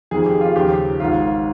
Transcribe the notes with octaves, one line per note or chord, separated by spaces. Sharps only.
F1 F2 D#3 G#4
G4
F4
D#2 C#3 F3 G4
G#1 G#2 D#3 F4